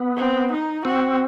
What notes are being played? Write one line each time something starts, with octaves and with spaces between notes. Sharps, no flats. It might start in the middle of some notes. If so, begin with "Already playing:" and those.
Already playing: B3
C4
D#4
C4 F#4